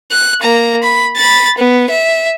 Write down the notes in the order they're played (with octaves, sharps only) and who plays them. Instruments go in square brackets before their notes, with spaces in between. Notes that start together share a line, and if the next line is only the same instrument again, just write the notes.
[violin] F#6
A#3 A#5
B5
B5 A6
B3
E5